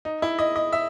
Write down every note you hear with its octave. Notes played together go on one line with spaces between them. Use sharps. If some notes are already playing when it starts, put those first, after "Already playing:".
D#4
E4
D#5
D#5
E5